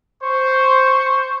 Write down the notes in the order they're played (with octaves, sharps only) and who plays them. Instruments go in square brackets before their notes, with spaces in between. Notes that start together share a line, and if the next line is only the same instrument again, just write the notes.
[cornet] C5 [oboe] C#6